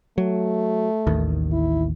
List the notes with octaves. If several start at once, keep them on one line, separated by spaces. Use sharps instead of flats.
F#3 A3
A1 D#2 D#3
E4